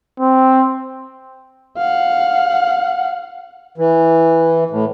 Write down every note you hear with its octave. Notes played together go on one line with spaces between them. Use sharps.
C4
F5 F#5
E3
A2